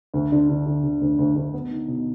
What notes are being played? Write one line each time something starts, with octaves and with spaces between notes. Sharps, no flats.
D2
D3
D3
D3
D3
D2
D2
D2
B3
D#4
B2